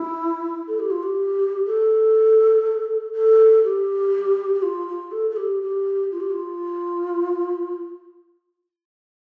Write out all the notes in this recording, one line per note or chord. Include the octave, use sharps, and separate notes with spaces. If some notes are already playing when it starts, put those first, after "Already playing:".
Already playing: E4
A4
G4
F4
G4
A4
A4
G4
G4
F4
F4
A4
A4
G4
G4
F4
G4
F4